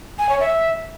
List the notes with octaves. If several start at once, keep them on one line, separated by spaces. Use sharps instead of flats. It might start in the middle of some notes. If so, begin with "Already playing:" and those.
G#5
C#5
E5